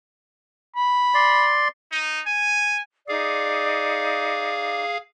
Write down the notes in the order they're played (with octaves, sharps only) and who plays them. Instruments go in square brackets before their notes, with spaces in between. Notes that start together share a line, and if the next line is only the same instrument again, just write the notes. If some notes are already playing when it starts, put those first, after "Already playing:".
[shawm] B5
[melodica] D5 C6
[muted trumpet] D#4
G#5
[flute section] D#4 D5 D6 [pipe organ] G#4 F5